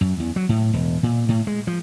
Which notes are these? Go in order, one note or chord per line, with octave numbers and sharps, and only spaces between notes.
F#2
E2
F#3
A2
E1
A#2
A2
G#3
F3